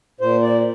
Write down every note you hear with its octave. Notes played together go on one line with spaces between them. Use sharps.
A#2 C5
D5